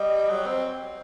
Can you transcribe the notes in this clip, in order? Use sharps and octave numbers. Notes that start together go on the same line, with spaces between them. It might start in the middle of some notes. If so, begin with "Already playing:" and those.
Already playing: G3 D#5
F#3
C4